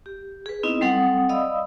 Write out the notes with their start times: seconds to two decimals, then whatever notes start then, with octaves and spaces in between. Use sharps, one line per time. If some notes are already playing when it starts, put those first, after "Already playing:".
0.06 G4
0.46 G#4 B4
0.63 B3 C4 D#4 E4 D#5
0.81 F#3 G3 C4 A4 F#5 D#6
1.29 D5 D#5 F5 B5 D#6 E6